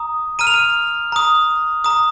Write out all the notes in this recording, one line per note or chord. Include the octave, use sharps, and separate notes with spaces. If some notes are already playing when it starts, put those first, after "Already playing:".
Already playing: A#5 D#6
A#5 F6 D#7
F7
D#7
A#5 D#6
A#5 D#6